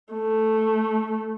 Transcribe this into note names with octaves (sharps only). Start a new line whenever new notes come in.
A3